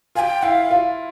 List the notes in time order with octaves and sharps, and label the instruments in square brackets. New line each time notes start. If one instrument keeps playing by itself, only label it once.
[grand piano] F4 [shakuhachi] G#5
[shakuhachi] G5
[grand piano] E4 [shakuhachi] F5
[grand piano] F4